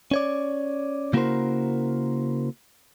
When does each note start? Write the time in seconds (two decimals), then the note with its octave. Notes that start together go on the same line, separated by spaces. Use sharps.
0.11 C#4 C#5 D5
1.13 C#3 A#3 E4 F#4 A#4 C5